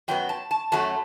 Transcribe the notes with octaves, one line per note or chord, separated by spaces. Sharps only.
F#2 F#3 B3 G5
A5
A5
F#2 F#3 A3 A5